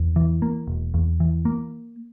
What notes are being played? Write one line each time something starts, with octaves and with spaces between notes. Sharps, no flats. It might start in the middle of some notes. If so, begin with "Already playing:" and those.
Already playing: E2
E3
A#3
E1
E2
E3
A#3